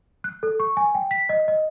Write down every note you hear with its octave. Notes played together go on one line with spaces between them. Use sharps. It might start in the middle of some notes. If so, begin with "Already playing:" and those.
F#6
A4
C#6
G#5
G5
B6
D#5
D#5